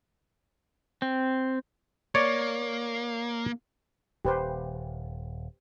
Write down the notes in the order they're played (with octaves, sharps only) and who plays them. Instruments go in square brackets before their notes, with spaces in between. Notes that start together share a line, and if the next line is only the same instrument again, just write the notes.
[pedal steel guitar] C4
[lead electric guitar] A#3 [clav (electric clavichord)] C#5 D5
[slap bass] D#1 [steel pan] G4 B4 C5